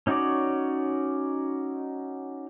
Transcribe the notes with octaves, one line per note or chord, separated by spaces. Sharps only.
C#4 D#4 F#4 C#5 D5